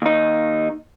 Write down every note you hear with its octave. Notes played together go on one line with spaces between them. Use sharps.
D#2 D#4